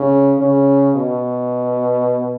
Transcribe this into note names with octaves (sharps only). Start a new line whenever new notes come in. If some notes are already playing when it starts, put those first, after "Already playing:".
Already playing: C#3
C#3
B2